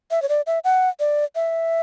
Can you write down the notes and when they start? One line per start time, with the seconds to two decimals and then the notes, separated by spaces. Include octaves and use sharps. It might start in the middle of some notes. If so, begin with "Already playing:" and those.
0.11 E5
0.22 C#5
0.29 D5
0.47 E5
0.64 F#5
1.00 D5
1.35 E5